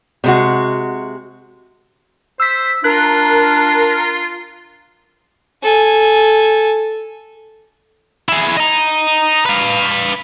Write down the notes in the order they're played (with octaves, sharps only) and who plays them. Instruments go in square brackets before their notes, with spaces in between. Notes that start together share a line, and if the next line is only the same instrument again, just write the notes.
[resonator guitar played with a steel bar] C3 G#3 F#4
[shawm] C5 [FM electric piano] E6 B6
[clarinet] D4 [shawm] F4 [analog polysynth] A#4 [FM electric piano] F#6
[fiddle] A4 G#5
[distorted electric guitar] E4 G#4
D#5 A#5
B4 F5